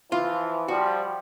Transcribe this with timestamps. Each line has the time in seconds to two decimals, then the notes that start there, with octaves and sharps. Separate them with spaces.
0.12 E3 F3 F4
0.68 F3 G3 F#4